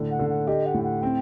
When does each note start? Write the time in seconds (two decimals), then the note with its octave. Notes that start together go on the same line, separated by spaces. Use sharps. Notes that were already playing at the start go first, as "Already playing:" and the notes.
Already playing: A2 D3
0.11 F#5
0.19 D3
0.29 F#5
0.47 G4 D#5
0.66 F#5
0.74 A2
0.84 F#5
1.02 C4 G5